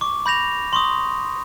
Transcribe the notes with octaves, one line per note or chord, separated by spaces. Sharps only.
C#6 D6
B5 G6 A#6 F7
C6 C#6 D#6